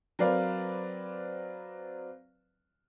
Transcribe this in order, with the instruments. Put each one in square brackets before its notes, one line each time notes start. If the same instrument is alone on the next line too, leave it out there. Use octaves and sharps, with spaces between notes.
[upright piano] F#3 C4 A#4 B4 D5 F5